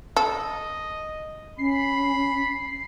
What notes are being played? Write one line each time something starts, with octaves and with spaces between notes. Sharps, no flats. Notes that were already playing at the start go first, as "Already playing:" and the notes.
A4 D#5
C#4 B5 C7